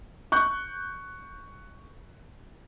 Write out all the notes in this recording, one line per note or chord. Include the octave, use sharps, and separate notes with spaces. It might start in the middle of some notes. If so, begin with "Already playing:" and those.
C#6 F#6 G6